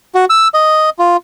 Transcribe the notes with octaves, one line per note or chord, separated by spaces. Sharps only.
F#4
E6
D#5
F4